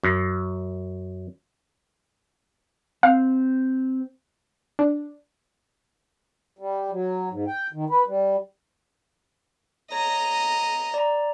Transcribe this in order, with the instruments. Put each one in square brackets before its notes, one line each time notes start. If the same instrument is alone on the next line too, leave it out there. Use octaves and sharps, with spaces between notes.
[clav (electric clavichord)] F#2
[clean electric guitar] C4 [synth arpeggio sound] F5
[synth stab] D4
[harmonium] G3
F#3
G#2
G5
D#3
B4
G3
[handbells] C#5 [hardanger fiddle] D#5 A#5
[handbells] D5 A#5